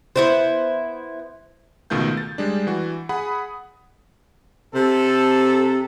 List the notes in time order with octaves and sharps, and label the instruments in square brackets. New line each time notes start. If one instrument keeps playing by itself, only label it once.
[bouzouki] B3 E4 C5
[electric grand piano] C#2 B2 D#3 A3 F4 G6
A6
G3 G#3 D4
E3 F#4
G#4 F#5 B5 D#6
[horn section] C3 A4